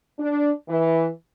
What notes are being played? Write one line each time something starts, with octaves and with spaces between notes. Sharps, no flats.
D4
E3